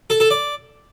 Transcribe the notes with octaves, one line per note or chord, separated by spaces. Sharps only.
A4
A4
D5